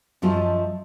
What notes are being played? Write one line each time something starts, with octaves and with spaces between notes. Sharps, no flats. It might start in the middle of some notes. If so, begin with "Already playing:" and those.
F#2 F3 A3 F4 D#5